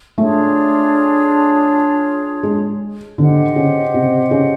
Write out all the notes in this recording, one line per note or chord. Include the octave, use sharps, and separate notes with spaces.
A3 D4 F4 G#4 C#5
G#3
D3 G4 C5 D#5 F#5
C#3
C3
C#3